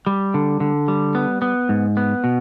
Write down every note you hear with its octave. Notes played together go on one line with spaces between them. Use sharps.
G3
D3
D3
G3
B3
B3
G#2
B3
B2